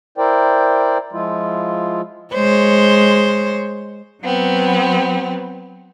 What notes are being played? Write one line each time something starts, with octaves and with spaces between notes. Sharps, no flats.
E4 A#4 C5 D5 G5
F3 G#3 E4 F4
G#3 C5 C#5
F#3 B3 C4